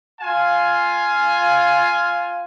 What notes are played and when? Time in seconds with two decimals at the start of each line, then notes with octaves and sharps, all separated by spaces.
0.20 F4 F5 G#5